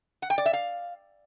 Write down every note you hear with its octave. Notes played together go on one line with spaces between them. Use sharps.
F#5
G5
D5
E5
F5